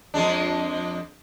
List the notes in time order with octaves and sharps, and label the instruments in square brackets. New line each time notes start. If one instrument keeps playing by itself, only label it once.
[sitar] F2 G#3 D4